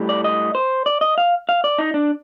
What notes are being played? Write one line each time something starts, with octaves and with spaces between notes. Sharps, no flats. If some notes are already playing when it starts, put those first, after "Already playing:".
Already playing: A2 G3
D5
D#5
C5
D5
D#5
F5
F5
D5
D#4
D4